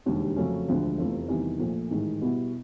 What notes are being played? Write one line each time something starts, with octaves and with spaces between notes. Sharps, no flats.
E1 D#2 D3 G3
F2 C#3 F#3 A3 C#4
E1 D2 D3 F3 G#3
F1 E2 C3 F3 A3
E2 C3 D#3 G3
A#1 A#2 F3 A3
A1 G#2 D#3 G#3
B2 G3 B3 E4